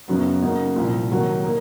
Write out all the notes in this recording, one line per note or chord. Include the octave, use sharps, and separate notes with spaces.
F#2 C#3 F#3 B3
C#3 F#3 A#3 D#4
C2 A#2 F3
C3 D#3 F#3 A#3
A#3 D#4